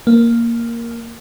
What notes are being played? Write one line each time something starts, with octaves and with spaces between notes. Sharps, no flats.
A#3